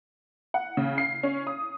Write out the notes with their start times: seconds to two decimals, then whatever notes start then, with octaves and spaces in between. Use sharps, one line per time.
0.54 F#5
0.77 C#3
0.98 C7
1.23 C#4
1.47 D#6